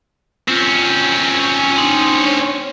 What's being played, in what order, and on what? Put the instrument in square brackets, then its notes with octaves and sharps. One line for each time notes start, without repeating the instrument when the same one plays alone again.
[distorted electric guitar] C4 C#4 [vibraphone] F4
[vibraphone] D4 D#4 C6
C#5